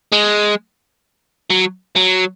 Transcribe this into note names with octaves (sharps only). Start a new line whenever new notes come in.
G#3
F#3
F#3